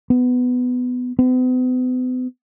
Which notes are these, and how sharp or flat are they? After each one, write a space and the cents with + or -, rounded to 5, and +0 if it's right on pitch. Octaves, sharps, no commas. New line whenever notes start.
B3 +15
B3 +45